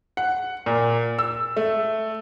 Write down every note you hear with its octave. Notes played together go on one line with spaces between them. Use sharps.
F#5
A#2
E6
A3